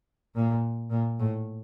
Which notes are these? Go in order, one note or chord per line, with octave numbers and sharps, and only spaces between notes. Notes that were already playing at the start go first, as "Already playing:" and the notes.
A#2
A#2
A2